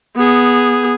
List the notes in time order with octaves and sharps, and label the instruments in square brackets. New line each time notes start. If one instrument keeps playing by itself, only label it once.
[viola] B3 G#4